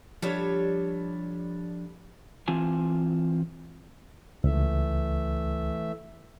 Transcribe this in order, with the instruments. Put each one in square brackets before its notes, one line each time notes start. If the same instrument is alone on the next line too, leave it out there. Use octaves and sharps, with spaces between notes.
[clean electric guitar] F3 D4 [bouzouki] G3 A4 C#5
[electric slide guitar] E3 C4 F4 G#5 A5
[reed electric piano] C#2 [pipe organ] E3 A3 E5